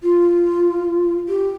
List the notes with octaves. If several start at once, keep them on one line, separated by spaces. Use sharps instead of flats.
F4
G4